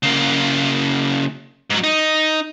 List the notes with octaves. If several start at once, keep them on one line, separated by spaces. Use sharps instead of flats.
C#3 A#3
G#2 F#3
D#4